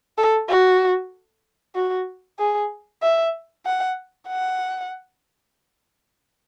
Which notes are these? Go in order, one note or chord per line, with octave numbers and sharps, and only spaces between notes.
A4
F#4
F#4
G#4
E5
F#5
F#5